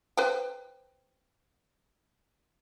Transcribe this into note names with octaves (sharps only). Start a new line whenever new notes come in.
B4 C5 G5